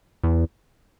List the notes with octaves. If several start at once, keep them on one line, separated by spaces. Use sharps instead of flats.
E2